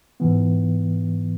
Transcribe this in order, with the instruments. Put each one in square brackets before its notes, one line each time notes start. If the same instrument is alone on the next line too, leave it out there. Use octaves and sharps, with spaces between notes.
[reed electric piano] G#2 E3 B3